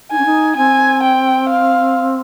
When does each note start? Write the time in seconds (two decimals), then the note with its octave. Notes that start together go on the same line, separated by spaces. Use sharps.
0.11 D#4 G#5
0.18 C#4
0.26 D#4
0.57 C4 G#5
1.03 G5
1.49 F5